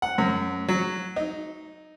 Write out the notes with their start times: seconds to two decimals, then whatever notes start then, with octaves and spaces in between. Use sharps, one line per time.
0.02 F#5
0.18 F#2
0.68 F#3
1.16 D#4